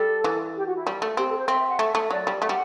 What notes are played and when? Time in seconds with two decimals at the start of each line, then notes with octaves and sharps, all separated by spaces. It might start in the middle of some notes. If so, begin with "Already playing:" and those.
Already playing: G3 A4
0.24 E3
0.56 G4
0.65 F#4
0.76 E4
0.87 G3
1.02 A3
1.17 C4 G4
1.27 A4
1.37 C5
1.48 C4 E5
1.59 E5
1.69 F#5
1.79 A3 E5
1.95 A3 E5
2.10 F#3 D5
2.27 G3
2.42 A3 F#5
2.49 G3